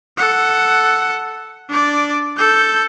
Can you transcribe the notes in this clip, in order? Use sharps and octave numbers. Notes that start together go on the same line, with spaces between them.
A4 F#5
D4 D5
A4 G6